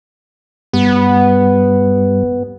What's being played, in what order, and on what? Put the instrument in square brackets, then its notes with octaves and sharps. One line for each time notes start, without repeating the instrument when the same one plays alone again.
[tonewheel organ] G2 G3 [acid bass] B3